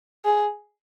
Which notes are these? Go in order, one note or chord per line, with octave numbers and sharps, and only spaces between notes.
G#4